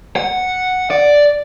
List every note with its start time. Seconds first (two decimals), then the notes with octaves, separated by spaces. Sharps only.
0.16 F#5
0.91 D5